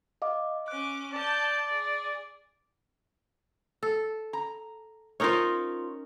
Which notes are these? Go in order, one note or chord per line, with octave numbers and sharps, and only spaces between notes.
D#5 F5 D6
C#4 D6 F#6
D5 A5 G6
G#4
A4
A#5
C#4 D#4 F4 A#4 C5 C#5